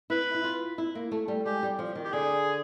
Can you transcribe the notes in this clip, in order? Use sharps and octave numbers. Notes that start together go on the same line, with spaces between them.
E4 B4
E4
F4
E4
A#3
A3
G3
G#3 G4
G3
F3
D#3
G4
D3 G#4